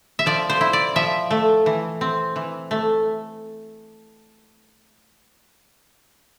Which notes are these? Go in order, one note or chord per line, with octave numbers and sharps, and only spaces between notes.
E5
F3 D5
C5
E4
D5
F3 E5
A3
E3
C4
E3
A3